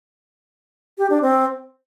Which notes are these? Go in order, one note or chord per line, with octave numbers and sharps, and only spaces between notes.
G4
D4
C4